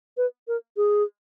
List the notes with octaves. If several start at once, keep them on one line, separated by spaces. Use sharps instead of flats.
B4
A#4
G#4